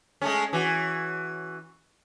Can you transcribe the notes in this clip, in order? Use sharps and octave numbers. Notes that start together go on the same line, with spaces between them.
G#3 A3 C#4
E3 F#4